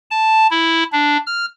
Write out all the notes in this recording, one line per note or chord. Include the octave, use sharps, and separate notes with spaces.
A5
E4
D4
F6